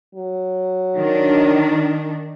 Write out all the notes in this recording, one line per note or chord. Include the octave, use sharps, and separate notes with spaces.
F#3
D#3 D4